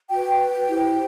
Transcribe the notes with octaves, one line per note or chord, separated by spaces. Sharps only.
F#4 B4 G5
E4 G4 C5